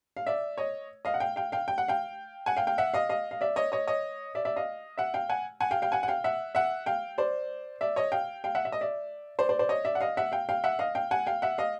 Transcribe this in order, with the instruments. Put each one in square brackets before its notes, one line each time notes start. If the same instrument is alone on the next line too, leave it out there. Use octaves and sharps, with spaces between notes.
[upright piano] F5
D5 E5
C#5 D#5
D#5 F5
F#5
F5 G5
F5 G5
F5 G5
G5
F#5
F5 G5
F#5 G#5
F5 G5
F5 G5
E5 F#5
D#5 F5
D#5 F5
F5
D5 E5
C#5 D#5
C#5 D#5
C#5 D#5
D5 E5
D5 E5
D#5 F5
E5 F#5
F5 G5
F#5 G#5
F#5 G#5
F5 G5
F5 G5
F#5 G#5
F#5
F5 G5
E5 F#5
E5 F#5
F5 G5
C5 D5
D5 E5
C#5 D#5
F5 G5
F5 G5
E5 F#5
E5
D#5
D5 E5
C5 D5
C5 D5
C5 D5
C#5 D#5
D5 E5
F#5
D#5 F5
E5 F#5
F5 G5
F5 G5
E5 F#5
D#5 F5
F5 G5
F#5 G#5
F5 G5
E5 F#5
D#5 F5